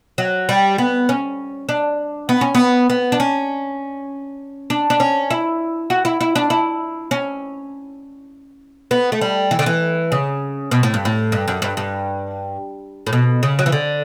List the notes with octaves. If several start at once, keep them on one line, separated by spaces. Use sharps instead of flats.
F#3
G3
B3
C#4
D4
B3
C#4
B3
B3
D4
C#4
D4
D4
C#4
E4
F#4
E4
E4
D4
E4
C#4
B3
A3
G3
E3
D3
E3
C#3
B2
A2
G2
A2
G2
F#2
G2
G2
A2
B2
C#3
F#3
E3
D3